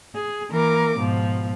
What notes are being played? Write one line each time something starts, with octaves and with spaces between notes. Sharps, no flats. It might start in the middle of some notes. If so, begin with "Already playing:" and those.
G#4
E3 A#3 A#4 D6
G#2 B2 F3